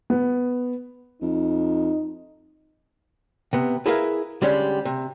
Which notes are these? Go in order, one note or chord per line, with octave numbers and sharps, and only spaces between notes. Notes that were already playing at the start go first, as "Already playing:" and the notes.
B3
F2 D#4
C3 B3
E4 G#4 A#4 B4 E5 F5
D3 G3 G#3 C#4
C3